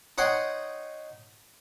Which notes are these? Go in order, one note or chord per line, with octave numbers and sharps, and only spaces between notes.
D#4 C#5 F#5 G5 C6